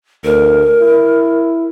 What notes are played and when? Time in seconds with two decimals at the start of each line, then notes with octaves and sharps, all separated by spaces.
0.24 D2 A#4
0.81 E4